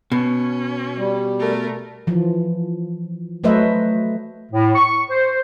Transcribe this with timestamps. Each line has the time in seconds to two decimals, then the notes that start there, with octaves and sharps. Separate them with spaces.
0.12 B2 C#4
0.98 G3
1.39 A3 A#4
2.07 E3 F3
3.44 F#3 A3 B4 C5 D#5 E5
4.52 A2
4.75 C#6
5.10 C5